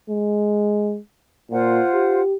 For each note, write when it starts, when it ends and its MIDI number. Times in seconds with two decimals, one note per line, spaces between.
0.10 0.99 56
1.51 1.81 46
1.51 2.21 65
1.51 2.21 72
1.51 2.21 78
1.94 2.37 67